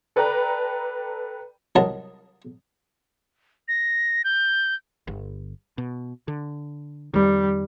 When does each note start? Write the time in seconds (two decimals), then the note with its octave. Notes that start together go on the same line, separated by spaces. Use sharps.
0.16 A4 B4 D5 G5 A#5
1.75 C2 F#3 A#4 D#5 A5
3.68 A#6
4.24 G6
5.07 G1
5.78 B2
6.28 D3
7.14 F2 D#3 G3